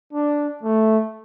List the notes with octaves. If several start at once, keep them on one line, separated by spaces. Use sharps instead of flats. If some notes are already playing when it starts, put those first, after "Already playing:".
D4
A3